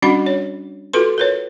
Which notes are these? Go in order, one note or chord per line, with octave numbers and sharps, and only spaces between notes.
G3 C#4 D4 F#4 F#5 B5
C#5
F4 F#4 A4 B4 C6
A#4 B4 C#5